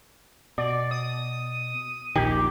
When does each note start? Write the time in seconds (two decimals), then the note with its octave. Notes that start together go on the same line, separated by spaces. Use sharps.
0.58 B2 D5
0.91 D#6
2.16 D#1 A#1 D#3 G4